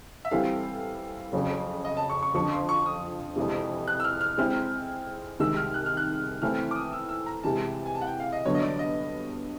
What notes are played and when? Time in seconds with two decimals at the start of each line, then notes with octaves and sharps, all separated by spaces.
0.25 E5
0.31 E3 G3 C4 E4 A4 F5
1.33 F2 C#3 F#3
1.85 D#5
1.97 A5
2.10 C#6
2.23 C#6
2.34 F2 D3 F3 C#6
2.52 C6
2.69 C#6
2.86 D#6
3.36 F2 C3 E3 G#3
3.88 F#6
4.00 E6
4.04 F6
4.21 F6
4.38 G#3 C4 E4 F6
5.39 C2 C3 D#3 G#3 E6
5.57 F6
5.74 F#6
5.86 F6
5.97 F#6
6.42 E3 A3 C4 E4 F6
6.71 D6
6.76 D#6
6.93 E6
7.09 E6
7.26 A#5
7.43 C3 E3 G#3 A5
7.86 G#5
7.95 A5
8.01 F#5
8.07 G5
8.20 F5
8.33 D#5
8.45 G2 D3 F#3 B3 C#5
8.55 D#5
8.62 D5
8.79 D#5